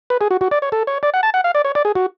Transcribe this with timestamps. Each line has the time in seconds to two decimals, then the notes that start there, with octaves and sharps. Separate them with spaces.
0.10 B4
0.21 G#4
0.31 F#4
0.41 F#4
0.51 D5
0.62 C#5
0.72 A4
0.87 C#5
1.03 D5
1.14 F#5
1.23 A5
1.34 F#5
1.44 F5
1.55 D5
1.65 C#5
1.75 D5
1.85 G#4
1.95 F#4